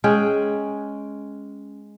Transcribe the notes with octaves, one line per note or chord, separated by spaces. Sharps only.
G#3 C#4 G5